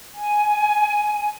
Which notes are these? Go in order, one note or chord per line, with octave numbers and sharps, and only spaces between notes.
G#5